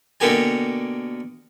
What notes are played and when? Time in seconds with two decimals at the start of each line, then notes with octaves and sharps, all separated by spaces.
0.20 B2 D3 A#3 G4 G#5